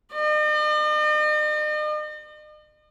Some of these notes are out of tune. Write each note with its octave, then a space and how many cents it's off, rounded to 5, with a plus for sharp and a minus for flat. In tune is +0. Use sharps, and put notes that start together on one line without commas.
D#5 -45